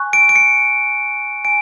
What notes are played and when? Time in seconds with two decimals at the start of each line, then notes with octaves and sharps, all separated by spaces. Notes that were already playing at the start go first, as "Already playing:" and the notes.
Already playing: G#5 C#6 F#6
0.13 D7
0.29 D7
0.36 C#7
1.45 G#5 D7